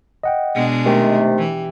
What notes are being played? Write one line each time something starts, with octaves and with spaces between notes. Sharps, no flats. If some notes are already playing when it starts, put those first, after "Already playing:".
D#5 F#5 G5
B2 G#3 D4
C3 D#3 A3 G4 G5
E3